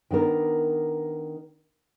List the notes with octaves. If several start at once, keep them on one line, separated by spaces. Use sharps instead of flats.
D#3 B3 D4 A#4